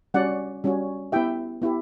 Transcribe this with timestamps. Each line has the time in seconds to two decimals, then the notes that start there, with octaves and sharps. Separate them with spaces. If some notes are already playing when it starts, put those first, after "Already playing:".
0.14 G3 C#4 F#4 D5 F#5
0.64 G3 C#4 F#4
1.12 B3 E4 G4 E5 G5
1.62 B3 E4 G4